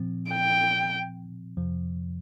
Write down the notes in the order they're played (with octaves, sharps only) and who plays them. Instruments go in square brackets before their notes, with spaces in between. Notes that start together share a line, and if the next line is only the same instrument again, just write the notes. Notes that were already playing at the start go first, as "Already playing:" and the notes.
Already playing: [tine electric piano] A#2 F3 C4
[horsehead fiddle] G5
[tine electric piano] F2 C3 F3